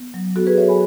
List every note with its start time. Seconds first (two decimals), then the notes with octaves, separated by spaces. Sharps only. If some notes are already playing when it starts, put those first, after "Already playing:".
Already playing: B3
0.14 F#3
0.36 B3 F#4 A4
0.47 G#4 B4
0.57 F#3 C#5 E5
0.68 G#5 B5